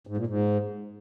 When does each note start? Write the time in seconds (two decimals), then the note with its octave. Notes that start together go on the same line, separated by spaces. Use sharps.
0.07 G#2
0.17 A#2
0.27 G#2